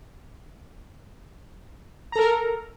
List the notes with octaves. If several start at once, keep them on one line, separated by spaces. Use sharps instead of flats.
A4 A#4 A#5